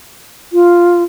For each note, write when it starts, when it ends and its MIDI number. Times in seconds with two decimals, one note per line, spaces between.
0.53 1.03 65